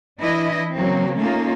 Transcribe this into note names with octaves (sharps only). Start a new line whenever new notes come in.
E3 D4 E4 D#5
C#3 F#3 A#3 C4
A3 A#3 C#4 D#4 F4